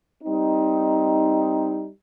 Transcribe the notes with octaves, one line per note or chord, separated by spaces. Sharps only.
G3 C4 D#4